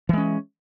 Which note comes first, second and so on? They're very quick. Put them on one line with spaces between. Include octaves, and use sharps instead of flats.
E3 G#3 C#4